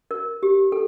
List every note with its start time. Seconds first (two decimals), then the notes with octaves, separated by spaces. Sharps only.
0.11 A#4
0.43 G4
0.72 A4